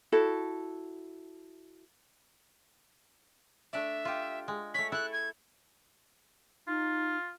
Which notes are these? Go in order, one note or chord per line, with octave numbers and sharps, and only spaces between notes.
E4 F#4 A4
A3 D4 D5 E5
F4 G4
G#3
A3 C#5 B6
E4 A4 E5 F#6
G#6
D#4 F4